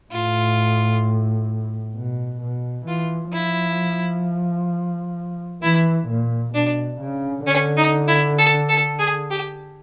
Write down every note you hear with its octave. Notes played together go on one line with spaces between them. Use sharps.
A2 F4
B2
B2
E3 F4
F3 E4
E3 E4
A#2
B2 D4
C#3
D3 C#4
D#4
E4
A4
A4
G#4
G4